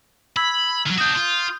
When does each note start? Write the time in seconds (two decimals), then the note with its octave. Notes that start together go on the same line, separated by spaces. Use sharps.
0.37 B5 E6 G#6 B6
0.86 D#3 F#3
0.98 D4 F#4 D#6 G6
1.15 F4